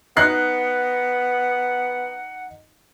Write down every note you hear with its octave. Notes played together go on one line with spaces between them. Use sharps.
B3 D#4 F#5 F#6 C7